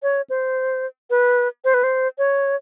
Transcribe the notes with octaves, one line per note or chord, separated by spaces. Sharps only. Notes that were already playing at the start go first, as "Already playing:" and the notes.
C#5
C5
B4
C5
B4
C5
C#5